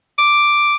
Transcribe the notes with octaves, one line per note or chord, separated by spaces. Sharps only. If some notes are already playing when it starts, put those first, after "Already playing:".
D6